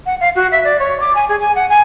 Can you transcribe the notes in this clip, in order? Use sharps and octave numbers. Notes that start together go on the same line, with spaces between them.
F#5
F5
F#4
E5
D5
C#5
D6
G#5
G#4
G#5
F#5
G#5